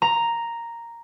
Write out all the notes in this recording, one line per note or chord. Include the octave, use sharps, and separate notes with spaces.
A#5